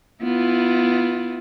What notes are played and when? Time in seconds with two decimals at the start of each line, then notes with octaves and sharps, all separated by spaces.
0.22 B3 E4 F4